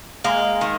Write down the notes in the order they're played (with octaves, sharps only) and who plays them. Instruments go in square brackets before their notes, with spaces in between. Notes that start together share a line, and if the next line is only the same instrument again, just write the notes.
[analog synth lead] G#3 [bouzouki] A#3
[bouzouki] D#3